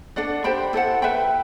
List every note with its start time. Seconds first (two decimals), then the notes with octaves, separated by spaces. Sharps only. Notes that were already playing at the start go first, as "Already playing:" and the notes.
0.16 D4 A4 D5 F#5
0.44 G4 C5 G5 B5
0.73 E4 A4 C5 F#5
1.02 B4 E5 G5 B5